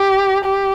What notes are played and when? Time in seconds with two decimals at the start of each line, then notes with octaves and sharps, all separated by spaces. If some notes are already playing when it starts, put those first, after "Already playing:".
Already playing: G4
0.45 G4